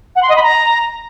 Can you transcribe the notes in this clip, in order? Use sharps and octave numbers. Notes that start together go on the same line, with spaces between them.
F#5
C6
D#5
B5
A#5